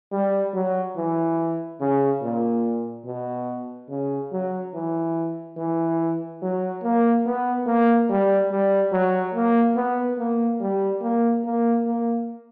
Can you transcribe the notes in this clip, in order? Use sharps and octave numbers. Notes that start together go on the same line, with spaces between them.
G3
F#3
E3
C#3
A#2
B2
C#3
F#3
E3
E3
F#3
A#3
B3
A#3
G3
G3
F#3
A#3
B3
A#3
G3
A#3
A#3
A#3